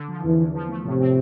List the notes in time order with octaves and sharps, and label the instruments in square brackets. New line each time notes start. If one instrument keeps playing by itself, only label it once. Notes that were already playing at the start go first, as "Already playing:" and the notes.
Already playing: [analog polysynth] D3
F3
[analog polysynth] E2 [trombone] E3
[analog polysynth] E2
F3
A3
[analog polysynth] A2 [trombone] C3
[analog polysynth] C4